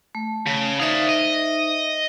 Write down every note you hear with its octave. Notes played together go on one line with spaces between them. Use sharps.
A3
C#3
D#4 C5 D5 E5 F5
D#5